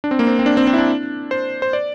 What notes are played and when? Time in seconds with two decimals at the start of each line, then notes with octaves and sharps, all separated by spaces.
0.04 D4
0.11 C4
0.19 A#3
0.27 C4
0.39 C4
0.46 D4
0.57 C4
0.67 C4
0.74 E4
0.78 D4
1.31 C5
1.62 C5
1.73 D5